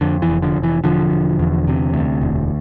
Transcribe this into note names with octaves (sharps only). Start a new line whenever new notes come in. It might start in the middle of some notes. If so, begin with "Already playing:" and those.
F2 D3
E3
F1
D3 F3
F1
E3
E1 D3 F3
E1
E2
C3
D2
E1